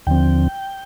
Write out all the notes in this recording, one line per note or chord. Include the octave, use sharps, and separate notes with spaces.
D#2 D3 F3 C4 G5